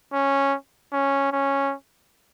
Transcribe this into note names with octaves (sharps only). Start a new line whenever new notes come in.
C#4
C#4
C#4